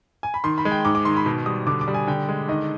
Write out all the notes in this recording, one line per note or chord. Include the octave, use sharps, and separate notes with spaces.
G#5
B5
D#3 C6
B5
G#3
G5
G#2 D6
D6
D#3 C6
B5
B2
G3 D#6
D3 D6
D6
G3
G#5
D3 G5
G#3
D#3 D#5